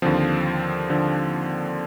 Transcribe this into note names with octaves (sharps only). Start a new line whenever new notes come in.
D#2 D3 F3 C4
D3 F3